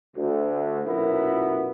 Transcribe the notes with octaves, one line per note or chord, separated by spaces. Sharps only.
D2
B1 F#2 A#2 B3 E4 A#4